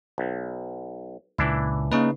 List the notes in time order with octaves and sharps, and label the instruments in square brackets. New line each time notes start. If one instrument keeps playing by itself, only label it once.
[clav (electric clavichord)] B1
[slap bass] C#2 A#2 [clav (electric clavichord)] E3 D4 E4
[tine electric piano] C#3 D#4 B4 [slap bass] A#3